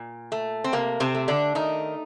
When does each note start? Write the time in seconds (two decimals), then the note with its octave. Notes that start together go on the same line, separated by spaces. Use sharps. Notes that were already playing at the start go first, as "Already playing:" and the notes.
Already playing: A#2
0.32 A3
0.64 C4
0.73 C3 A#3
1.00 C3 C4
1.14 A3
1.28 D3 D4
1.55 D#3 A3 D#4